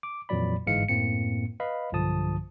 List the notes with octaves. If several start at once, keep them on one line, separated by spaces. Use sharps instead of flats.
D6
F2 A#2 E3 F#3 D5 B5
G1 G#2 E3 G#3 F5 C#7
F#2 A2 A#3 C4 C#7
B4 D#5 F5 B5
B1 G2 D3 F3 A5 D#6